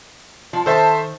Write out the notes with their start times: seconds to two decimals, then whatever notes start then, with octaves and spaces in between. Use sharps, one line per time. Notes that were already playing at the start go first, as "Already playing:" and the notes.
0.53 F3
0.66 D#3 A4 C5 E5 A5